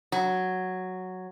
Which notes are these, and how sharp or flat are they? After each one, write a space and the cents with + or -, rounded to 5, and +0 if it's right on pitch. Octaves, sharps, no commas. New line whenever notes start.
F#3 +0